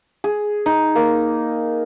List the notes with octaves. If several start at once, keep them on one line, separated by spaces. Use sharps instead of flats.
G#4
D#4
A#3